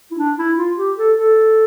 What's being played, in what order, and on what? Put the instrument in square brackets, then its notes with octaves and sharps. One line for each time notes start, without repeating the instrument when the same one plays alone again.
[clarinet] E4
D4
E4
F4
G4
A4
A4